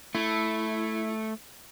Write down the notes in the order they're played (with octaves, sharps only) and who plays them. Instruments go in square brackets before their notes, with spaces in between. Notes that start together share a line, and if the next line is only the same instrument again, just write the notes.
[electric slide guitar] A3 [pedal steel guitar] E4